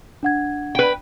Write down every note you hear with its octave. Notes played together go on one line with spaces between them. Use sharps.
D4 F#5 G#6
B4 G5